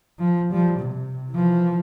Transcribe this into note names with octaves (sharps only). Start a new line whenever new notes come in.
F3
F3 G3
C3
E3 F3